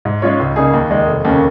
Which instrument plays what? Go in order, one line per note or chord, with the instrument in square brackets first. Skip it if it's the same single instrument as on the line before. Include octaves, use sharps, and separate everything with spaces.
[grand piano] G#2
G#3 C#4 F4 C#5
C#2
C#3 A#3 D#4 G#4
D#2
D#3 G#3 D#4
F1
D#2 C#3 A#3 C#4